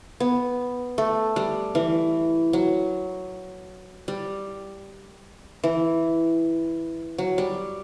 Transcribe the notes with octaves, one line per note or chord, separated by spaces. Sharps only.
B3
A3
G3
E3
F#3
G3
E3
F#3
G3